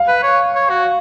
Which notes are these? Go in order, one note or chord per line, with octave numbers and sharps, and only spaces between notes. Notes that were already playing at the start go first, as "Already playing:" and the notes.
Already playing: F5
B4
C#5
C#5
F#4